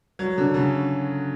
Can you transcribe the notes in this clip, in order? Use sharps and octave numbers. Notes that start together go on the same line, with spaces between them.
F#3
D3
C#3